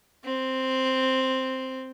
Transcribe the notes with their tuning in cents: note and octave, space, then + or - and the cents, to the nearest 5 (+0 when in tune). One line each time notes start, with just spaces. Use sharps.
C4 +0